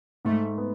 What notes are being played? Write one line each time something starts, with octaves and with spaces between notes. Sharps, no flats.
G#2 A3
B3